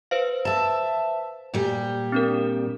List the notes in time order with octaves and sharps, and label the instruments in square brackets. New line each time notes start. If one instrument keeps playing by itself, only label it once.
[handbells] B4 C5 F5
[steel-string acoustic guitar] E5 A5
A#2 G3 G4
[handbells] C4 D4 A#4